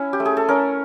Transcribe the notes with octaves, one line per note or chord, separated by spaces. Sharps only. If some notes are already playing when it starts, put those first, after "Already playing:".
Already playing: C#4 E4
G4
A3
G#4
A4
C#4 A#4